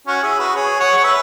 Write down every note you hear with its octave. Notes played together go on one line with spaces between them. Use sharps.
C#4 F#4
E4 G#4
F#4 B4
G#4 C#5
C#5 F#5
C#5
B4 E5